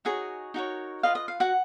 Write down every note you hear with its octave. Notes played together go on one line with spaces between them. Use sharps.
D#4 F#4 G#4 C#5 G#5
D#4 F#4 A#4 C#5
F4 B4 D#5 F5
D#5
F5
F#4 F#5